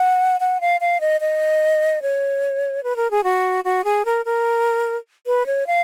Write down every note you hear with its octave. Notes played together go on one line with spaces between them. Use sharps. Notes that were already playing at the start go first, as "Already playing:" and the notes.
Already playing: F#5
F#5
F5
F5
D#5
D#5
C#5
B4
A#4
G#4
F#4
F#4
G#4
A#4
A#4
B4
C#5
F5